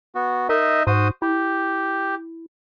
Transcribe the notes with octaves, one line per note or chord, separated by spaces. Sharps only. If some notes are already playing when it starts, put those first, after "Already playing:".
B3 F#4
D#4 A#4 D#5 E5
G#2 F#4 C5 D#6
E4 G4